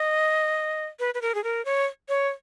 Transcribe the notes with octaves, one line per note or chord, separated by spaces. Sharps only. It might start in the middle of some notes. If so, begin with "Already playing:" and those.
Already playing: D#5
B4
B4
A#4
G#4
A#4
C#5
C#5